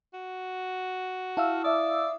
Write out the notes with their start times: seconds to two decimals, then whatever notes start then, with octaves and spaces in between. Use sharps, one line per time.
0.14 F#4
1.37 E4 F5 A5 E6 F6
1.64 D5 E5 D6 D#6